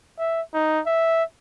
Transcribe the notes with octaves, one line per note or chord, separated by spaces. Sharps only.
E5
D#4
E5